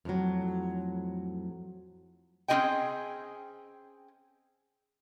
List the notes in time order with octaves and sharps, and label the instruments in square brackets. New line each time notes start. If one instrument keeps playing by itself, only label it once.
[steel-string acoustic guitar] F2 A2 D3 F#3
[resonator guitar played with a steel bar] C4 C#4 F#4 G#4 D#5 G5